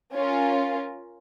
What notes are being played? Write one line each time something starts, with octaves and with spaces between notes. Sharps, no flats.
C#4 F4 A#4